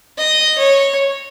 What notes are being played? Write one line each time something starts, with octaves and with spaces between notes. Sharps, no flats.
D#5
C#5